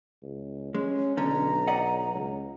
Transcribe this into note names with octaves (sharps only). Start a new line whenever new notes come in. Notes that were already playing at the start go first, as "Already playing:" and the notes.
C#2
G#3 C#4
B1 D3 C#4 A#5
D5 D#5 F#5
C#2